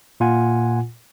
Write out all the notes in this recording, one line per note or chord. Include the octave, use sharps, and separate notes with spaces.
A#2 F4 F#5 G#5